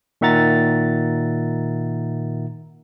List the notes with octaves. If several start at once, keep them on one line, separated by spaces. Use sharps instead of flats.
A#2 D#3 E5 F#5 A#5 A6